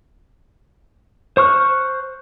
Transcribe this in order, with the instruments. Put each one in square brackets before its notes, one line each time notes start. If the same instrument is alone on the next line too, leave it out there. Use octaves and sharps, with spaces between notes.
[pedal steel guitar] C5 C#6 F6 F#6